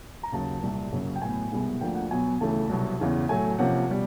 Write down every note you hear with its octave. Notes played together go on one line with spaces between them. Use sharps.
A#5
D#2 C#3 F#3 A5
C2 A#2 G3
F#2 C#3 F#3 A#3 C#4
G5
A2 F#3 B3 G#5
C2 B2 G#3 B3
D2 D3 F3 A#3 G5
F#5
B2 F#3 B3 G#5
D2 C#3 E3 A3 A5
C2 B2 F#3 B3
E2 C#3 E3
A2 F#3 A3 G#5
C3 F3 A#3 C#4 F#5
B2 G3